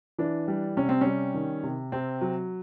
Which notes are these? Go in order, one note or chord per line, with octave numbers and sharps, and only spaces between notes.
E3 D4
G3
C3 C#4
C4
G3 C#4
D#3
C3
C3 C4
F#3